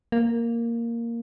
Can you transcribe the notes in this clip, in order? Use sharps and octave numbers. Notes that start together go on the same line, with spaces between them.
A#3